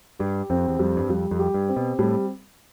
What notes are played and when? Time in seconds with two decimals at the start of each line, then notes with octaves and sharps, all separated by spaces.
0.19 G2 G4
0.50 F2 C4
0.68 E2
0.79 F2 G3
0.97 G2
1.09 F2 G3
1.31 F2
1.39 G4
1.54 G2
1.69 C4
1.76 B2
1.99 A2 G3